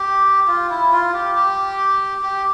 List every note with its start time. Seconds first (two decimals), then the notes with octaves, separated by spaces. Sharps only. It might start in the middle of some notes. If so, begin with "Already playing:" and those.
Already playing: G4
0.48 F4
0.70 E4
0.92 F4
1.14 G4
1.35 G4
2.22 G4